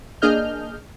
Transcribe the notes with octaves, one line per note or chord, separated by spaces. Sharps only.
A#3 D4 G#4 D#5 F6 G6